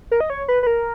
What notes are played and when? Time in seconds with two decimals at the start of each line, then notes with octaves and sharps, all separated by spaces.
0.11 A#4
0.20 D#5
0.30 C#5
0.48 B4
0.63 B4
0.67 A#4